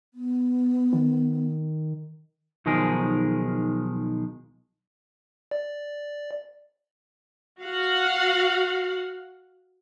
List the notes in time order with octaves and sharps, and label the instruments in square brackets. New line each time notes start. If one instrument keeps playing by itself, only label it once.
[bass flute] B3
[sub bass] D#3
[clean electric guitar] B1 D#3 F3 G#3 G#4 A#4
[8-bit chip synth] D5
[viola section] F#4 F5 F#5